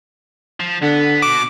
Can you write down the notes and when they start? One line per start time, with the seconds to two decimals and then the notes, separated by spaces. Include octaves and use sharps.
0.60 F3
0.82 D3 B3
1.22 B2 F#4 D6